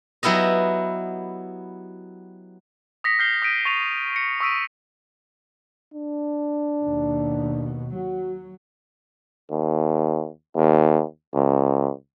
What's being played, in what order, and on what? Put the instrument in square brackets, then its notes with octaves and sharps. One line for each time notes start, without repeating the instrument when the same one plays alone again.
[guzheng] F#3 B3 E4 G4 D#5
[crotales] D#6 A#6 B6 C#7
F6 G6 B6 C7 G7
D#6 G6 A#6 B6 D7 D#7
C#6 A6 D#7 F7 G7
A#6 C#7
C#6 D#6 E6 B6 D7 D#7
[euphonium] D4
[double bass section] D#2 B2
[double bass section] F#3 [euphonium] F#4
[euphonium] D#2
D#2
C#2